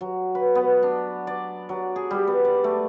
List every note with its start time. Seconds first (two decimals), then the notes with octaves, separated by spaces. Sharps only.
0.01 F#3
0.35 B4
0.55 B3
0.83 D4
1.27 D5
1.69 F#3
1.96 G#4
2.11 G3
2.27 B3
2.45 D5
2.64 A3